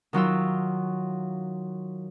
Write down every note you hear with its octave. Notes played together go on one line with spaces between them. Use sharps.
D#3 F#3 F4 E6